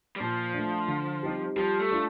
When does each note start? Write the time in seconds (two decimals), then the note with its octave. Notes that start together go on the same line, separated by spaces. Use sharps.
0.16 G3
0.20 A#2 F3
0.54 A3 D4
0.88 D3
1.23 G3 C4 D#4 G4
1.56 F3 G3
1.79 A3
1.91 D4 F4